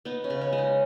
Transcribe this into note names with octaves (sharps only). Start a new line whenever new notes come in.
B3 D#4
C#4
C#3
C#4
G#3
D#4